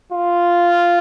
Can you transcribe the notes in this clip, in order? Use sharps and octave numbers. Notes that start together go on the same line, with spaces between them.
F4